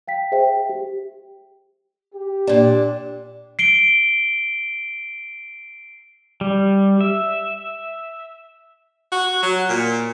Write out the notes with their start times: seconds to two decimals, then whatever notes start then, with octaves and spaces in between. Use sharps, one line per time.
0.08 F5 G5 B6
0.32 G#4 C5 E5 G5
0.69 G4
2.13 G4
2.47 A#2 D4
3.59 C7 D7 G7
6.41 G3
7.01 E5
9.12 F#4
9.43 F#3
9.69 A#2